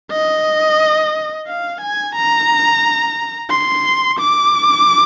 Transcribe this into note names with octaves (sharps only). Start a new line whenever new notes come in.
D#5
F5
G#5
A#5
C6
D6